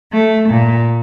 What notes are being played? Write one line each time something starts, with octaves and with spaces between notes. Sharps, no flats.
A3
A#2